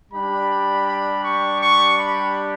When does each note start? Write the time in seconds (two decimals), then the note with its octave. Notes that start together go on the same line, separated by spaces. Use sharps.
0.12 G3 D4 G4 B5
0.87 B5
1.24 C#6
1.61 C#6
1.98 B5